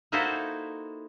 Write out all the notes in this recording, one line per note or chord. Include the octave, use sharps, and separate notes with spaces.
A#3 D#4 E4 F#4 A4 C5